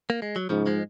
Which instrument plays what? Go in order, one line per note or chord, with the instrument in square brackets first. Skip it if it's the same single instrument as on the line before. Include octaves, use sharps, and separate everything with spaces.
[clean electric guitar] A#3
G#3
F#3
[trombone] G#2 [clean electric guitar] C#3 F3
[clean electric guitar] F3 G#3